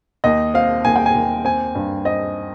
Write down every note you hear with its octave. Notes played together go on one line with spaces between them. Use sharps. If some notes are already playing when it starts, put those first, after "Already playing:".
D#2 D#5
C4 F5
D#2 G#5
G5
G#5
D#2
C4 G#5
G2
C4 D#5